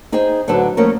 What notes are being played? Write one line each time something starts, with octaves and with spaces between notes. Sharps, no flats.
D#4 G#4 C5 D#5 G5
A2 D3 F#3 D4 B4 A5
F3 A3 A#3 C#4 A#4